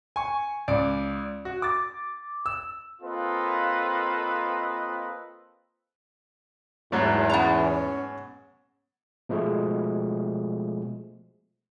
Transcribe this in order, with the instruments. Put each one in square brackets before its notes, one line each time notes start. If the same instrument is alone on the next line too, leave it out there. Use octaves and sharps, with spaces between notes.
[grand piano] G#5 C#6
C#2 D5 D7
F#4
D6 A6
E6
[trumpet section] A#3 C4 F4 A4 B4 D#5
[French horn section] E2 [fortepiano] G#2 F#3 A3 [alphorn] G#3
[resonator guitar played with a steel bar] B3 A#5 [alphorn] C#4
[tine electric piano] B2 F3 G#3 A3 G#4